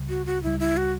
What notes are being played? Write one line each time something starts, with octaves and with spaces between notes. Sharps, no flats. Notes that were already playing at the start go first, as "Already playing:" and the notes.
Already playing: C#2 C#3 G3
F#4
F#4
C#2 C#3 G3 E4
E4
F#4